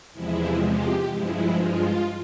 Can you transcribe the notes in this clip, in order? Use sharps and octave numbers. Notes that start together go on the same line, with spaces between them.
E2 C3 F3 G#3 E4
G4
G2 F3 G#3 E4
F4